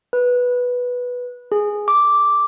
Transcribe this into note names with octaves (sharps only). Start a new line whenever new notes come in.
B4
G#4
D6